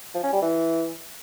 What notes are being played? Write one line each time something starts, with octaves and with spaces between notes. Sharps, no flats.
F3
C#4
G3
E3